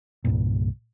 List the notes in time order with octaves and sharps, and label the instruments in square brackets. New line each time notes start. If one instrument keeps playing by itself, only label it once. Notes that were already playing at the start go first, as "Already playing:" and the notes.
[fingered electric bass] C2 G2 A#2